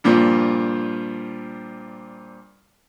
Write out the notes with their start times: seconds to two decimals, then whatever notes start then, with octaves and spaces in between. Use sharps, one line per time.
0.04 G2 A#2 F3